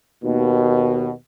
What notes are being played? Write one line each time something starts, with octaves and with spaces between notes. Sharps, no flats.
D#2 B2